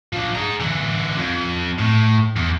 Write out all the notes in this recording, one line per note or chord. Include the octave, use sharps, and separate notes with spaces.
F3 D4
G#4 A#5
D3 E3
F2
A2
E2